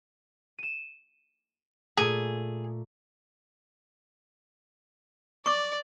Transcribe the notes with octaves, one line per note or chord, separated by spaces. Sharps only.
D#7 E7
A#2 A3 G#4
D5 C#6 D6